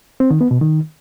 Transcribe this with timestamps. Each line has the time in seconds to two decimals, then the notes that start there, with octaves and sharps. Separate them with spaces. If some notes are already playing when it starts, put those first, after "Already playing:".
0.20 C4
0.30 D#3
0.41 B3
0.51 B2
0.61 D#3